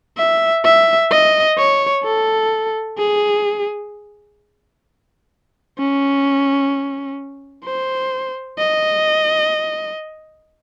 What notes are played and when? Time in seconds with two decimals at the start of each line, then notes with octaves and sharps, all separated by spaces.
0.18 E5
0.65 E5
1.11 D#5
1.58 C#5
2.05 A4
2.98 G#4
5.79 C#4
7.65 C5
8.59 D#5